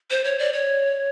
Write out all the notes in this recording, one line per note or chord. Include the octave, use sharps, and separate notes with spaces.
C5
C#5
D5
C#5